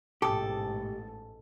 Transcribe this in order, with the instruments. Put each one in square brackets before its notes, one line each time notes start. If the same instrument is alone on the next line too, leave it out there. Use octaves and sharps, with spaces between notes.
[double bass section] A1 G#2 B2 [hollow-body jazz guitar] G4 [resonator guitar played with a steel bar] A4 [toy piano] D6 D#6